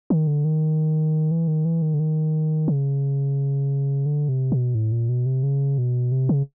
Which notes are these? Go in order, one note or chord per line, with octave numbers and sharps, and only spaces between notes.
D#3
D3
D#3
E3
D#3
E3
D#3
D3
D#3
C#3
D3
C3
B2
A2
A#2
B2
C3
C#3
B2
C3
C#3